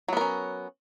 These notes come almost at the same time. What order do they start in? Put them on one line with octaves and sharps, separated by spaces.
F#3 B3 A#4 C#4